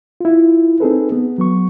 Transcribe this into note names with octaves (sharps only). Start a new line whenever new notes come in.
E4 F4
C4 D#4 G#4 A4 B4
B3
F#3 B3 C#6